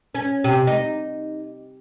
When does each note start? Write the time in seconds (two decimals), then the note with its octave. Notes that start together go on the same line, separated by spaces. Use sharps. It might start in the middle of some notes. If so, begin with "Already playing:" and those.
0.15 C#4
0.44 C3
0.67 D#4